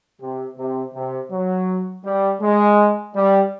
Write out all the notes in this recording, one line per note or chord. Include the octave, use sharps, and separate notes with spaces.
C3
C3
C3
F#3
G3
G#3
G3